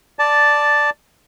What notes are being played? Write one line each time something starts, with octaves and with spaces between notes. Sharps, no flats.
D5 A5